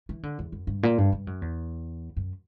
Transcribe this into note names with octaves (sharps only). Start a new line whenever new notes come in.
E3
D3
E2
F#2
G2
A#2
G2
G2
F#2
E2
F#2